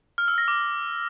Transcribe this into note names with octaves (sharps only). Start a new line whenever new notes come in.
F6
E6
A#6
D6